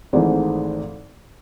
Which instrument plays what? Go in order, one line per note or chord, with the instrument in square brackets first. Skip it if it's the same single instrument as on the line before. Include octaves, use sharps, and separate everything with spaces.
[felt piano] G#1 G#2 E3 A3